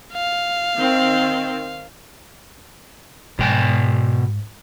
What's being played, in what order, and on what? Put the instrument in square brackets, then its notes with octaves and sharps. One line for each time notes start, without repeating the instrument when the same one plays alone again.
[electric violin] F5
[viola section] D#3 C4
[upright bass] G#2 [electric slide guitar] B2 G5 G#5